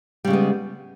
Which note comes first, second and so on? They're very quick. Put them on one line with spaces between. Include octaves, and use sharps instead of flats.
G3 C#3 G#3 B3